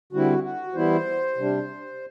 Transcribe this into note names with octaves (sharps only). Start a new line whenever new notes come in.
D3 G3 C4 E4 F#4
F#4
E3 G3 B3 E4 C5
C3 G3 D4